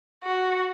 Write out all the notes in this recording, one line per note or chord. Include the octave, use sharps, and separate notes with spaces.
F#4